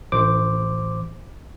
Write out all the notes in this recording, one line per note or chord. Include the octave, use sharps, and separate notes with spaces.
A1 C5 D6